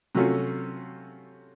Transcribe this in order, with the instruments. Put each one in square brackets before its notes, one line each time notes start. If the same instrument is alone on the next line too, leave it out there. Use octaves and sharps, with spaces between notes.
[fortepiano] C3 F#3 A3 C#4 F4